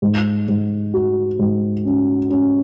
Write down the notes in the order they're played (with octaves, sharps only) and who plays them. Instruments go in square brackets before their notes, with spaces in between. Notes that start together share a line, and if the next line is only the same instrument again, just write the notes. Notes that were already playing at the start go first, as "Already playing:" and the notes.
[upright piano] G#2
G#2
F#4
G#2
C#4
C#4